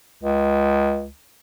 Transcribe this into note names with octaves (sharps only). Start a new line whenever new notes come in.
C#2